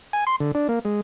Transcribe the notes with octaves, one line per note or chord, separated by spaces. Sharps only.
G#5
C6
D3
D4
A#3
G#3